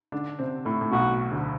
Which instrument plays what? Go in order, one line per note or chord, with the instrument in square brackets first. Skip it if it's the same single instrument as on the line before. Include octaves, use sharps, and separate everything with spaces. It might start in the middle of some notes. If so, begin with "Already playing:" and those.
[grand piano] D3 D4
C3 C4
A2 A3
A2
[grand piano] B1 B2 [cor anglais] F#4
[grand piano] D2 D3